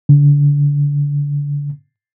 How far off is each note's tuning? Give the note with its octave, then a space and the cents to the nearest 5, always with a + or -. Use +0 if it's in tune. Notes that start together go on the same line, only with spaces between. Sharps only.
D3 -30